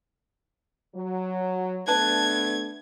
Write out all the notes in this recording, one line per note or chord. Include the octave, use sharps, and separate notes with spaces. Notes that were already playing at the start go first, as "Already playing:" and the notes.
F#3
A3 B3 D4 B4 A5 G#6